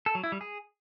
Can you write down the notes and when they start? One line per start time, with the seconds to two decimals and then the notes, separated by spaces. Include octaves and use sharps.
0.06 A4
0.15 F#3
0.24 E4
0.32 G3
0.41 G#4